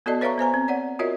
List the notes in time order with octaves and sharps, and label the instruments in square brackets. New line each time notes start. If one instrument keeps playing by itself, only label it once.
[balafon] B3 F#4 A4 D5 D#5 A5
B4 C#5 E5 F5 A#5 C#6
B3 C5 G#5 A#5
C4
C#5 D5 F#5
F4 F#4 A#4 C#5 D#5 E5